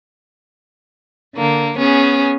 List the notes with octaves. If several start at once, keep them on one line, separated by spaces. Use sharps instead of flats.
D3 A#3
B3 C#4 G#4